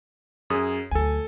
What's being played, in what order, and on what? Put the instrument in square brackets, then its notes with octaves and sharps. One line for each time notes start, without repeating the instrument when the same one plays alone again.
[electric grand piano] F#2 G#4 D#6
[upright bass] D2 F#3 [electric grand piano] A4 G#5